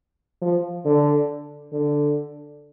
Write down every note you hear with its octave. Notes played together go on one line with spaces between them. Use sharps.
F3
D3
D3